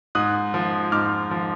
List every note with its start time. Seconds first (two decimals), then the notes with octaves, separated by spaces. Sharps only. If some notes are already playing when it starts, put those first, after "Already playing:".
0.15 G#2 D#6 F#6
0.54 F3
0.92 G#2 D6 F6
1.31 F3